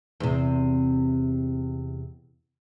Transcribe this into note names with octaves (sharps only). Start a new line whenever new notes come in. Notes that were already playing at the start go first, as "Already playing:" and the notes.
E2 C3